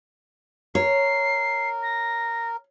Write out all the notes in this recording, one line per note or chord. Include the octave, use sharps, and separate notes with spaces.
A#4 C#5 C7
A#6